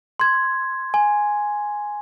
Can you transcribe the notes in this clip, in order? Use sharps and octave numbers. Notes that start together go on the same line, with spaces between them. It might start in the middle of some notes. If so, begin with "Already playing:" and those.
C6 G#6
G#5